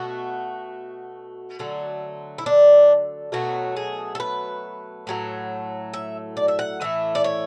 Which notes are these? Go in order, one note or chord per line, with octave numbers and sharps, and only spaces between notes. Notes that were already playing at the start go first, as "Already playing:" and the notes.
Already playing: B2 A3 F#4
D3 F#3 A3
E4
D4
B2 F#3 A3 F#4
G#4
A4
B4
A2 F#3 A3
E5
D5
E5
F#5
A2 E3 A3 E5
D5
C#5